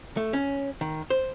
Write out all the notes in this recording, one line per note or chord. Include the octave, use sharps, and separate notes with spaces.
A3
C#4
D#3
C5